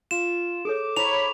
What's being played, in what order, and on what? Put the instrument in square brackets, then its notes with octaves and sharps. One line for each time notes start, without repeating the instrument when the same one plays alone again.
[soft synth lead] F4 [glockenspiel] E7
[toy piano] G#4 A4 C#5 [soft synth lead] D6
[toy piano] E4 C5 A#5 [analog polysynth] C#5 B5 [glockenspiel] F7